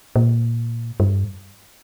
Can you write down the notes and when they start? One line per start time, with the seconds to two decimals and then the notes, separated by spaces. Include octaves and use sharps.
0.16 A#2
1.00 G2